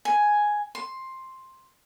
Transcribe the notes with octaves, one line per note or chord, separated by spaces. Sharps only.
G#5
C6